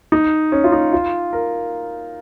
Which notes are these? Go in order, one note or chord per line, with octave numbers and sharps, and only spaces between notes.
D#4
C#4
F4
D#4
F4
A#4